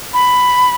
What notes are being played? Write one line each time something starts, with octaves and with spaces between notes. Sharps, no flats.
B5